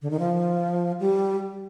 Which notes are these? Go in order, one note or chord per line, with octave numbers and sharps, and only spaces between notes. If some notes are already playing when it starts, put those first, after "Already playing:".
D3
D#3
F3
G3